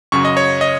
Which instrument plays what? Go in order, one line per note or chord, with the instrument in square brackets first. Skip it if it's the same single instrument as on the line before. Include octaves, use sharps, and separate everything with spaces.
[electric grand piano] F#2 C#3 F#3 C#6
D#5
C#5
D#5